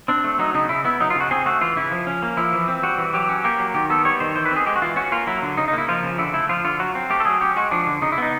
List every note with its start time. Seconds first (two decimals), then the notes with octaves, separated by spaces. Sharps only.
0.08 C4 D4
0.24 A3
0.39 F#3 D#4
0.54 C#3 D#4
0.69 C#3 E4
0.85 B3 E4
1.00 F#3 D#4
1.10 F4
1.16 C#3 F#4
1.31 C4 G#4
1.46 A3 F#4
1.61 E3 F4
1.76 C#3 E4
1.92 F3
2.07 C#4
2.22 A#3
2.37 F3 E4
2.53 E3
2.68 C4
2.83 G3 F#4
2.98 E3
3.14 F#3 G4
3.29 C#4
3.44 A#3 G4
3.59 F#3
3.75 D#3 G4
3.90 B3 A4
4.05 G3 C#5
4.20 D#3 C5
4.35 E3 C5
4.46 B4
4.51 C4
4.56 G#4
4.66 G#3 G4
4.76 F#4
4.82 E3 F4
4.96 C#4 F#4
5.12 A#3 F4
5.27 F#3 E4
5.42 D3
5.57 C#3 D#4
5.68 D#4
5.73 A#3 E4
5.88 F3 F4
6.03 C#3
6.18 D3 E4
6.34 A3 E4
6.49 F3 F4
6.64 D3 F4
6.79 F#3 F#4
6.95 C4
7.10 A3 G4
7.20 A4
7.25 F#3 G#4
7.41 C#4 G4
7.56 G#3 F#4
7.71 F3 D4
7.87 D3
8.02 C#3 D#4
8.12 E4
8.18 B3 D#4